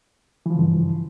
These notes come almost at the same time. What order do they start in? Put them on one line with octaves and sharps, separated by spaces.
E3 F3 C#3 G2